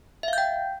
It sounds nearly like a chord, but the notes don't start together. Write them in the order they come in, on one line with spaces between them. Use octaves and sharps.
E5 F5 G6 G5